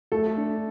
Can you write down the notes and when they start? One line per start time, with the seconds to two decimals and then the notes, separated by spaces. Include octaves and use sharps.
0.12 A3 A4
0.37 D4